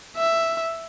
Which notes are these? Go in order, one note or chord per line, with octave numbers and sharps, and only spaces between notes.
E5